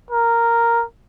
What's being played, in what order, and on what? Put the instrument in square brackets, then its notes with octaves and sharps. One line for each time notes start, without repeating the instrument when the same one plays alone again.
[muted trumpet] A#4